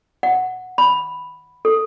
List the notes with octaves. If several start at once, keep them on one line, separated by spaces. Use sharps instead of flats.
F#5
B5
A4